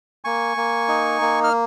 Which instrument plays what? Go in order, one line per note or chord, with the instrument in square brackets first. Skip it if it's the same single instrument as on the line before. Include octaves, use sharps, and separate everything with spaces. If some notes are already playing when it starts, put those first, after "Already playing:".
[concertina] A#3 G#5 C#6
A#3
D#4
A#3
F6